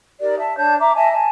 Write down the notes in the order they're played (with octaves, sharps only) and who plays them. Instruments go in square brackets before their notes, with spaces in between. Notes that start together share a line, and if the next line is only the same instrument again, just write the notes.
[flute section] D#4 G4 A#4 D5
E5 A5
D4 C#5 A5 G6
E5 A#5 D6
D#5 E5 G#5 A5
G#5 A5